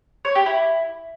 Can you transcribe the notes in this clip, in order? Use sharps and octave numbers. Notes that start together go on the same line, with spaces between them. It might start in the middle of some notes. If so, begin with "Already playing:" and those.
C#5
G4
E4